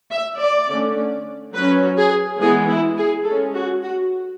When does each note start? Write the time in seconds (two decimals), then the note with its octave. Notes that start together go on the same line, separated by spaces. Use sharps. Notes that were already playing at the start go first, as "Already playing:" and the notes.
0.11 E5
0.40 D5
0.68 D3 A3 C#4
1.54 F#3 C#4 B4
1.97 G#4
2.39 E3 G#3 B3 G#4
2.68 E4
2.97 G#4
3.25 G#3 C#4 A4
3.54 F#4
3.82 F#4